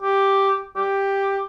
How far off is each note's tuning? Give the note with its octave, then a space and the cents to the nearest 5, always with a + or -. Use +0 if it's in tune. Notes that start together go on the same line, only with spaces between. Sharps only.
G4 +0
G4 +5